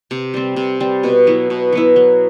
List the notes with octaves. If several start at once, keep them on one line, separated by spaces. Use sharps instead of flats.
C3
G3 C4
C3
G3 C4
B2
F#3 B3 E4
B2
F#3 B3 E4
F#3